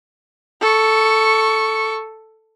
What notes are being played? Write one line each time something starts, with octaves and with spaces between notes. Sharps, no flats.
A4 C#6